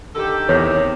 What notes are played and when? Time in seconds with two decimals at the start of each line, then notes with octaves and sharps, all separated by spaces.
0.15 D3 D#3 G4 A4
0.49 E2 C3 D#3 C#5